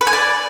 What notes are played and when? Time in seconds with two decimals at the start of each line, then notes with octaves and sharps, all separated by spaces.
0.01 B4
0.07 G#5
0.13 D5